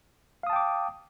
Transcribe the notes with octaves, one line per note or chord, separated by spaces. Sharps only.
F5 G5 A5 D6 D#6